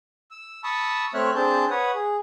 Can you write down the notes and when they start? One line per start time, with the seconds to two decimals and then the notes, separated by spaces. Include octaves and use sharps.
0.31 E6
0.64 A5 B5 C#6 D#6 E6
1.14 A3 C4 C#5 E5 F6 F#6
1.35 C4 D4 G#4 A5 G6
1.71 B4 C#5 F#5 D#6
1.95 G#4